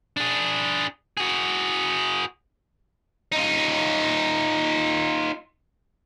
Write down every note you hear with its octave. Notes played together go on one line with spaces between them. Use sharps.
D4 G#4
F#4 G#4
D#4 F4